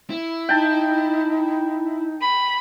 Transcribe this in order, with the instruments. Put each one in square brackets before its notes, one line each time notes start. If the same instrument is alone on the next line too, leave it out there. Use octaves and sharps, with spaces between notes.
[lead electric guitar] E4
[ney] D#4 [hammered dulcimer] G5 A5
[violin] B5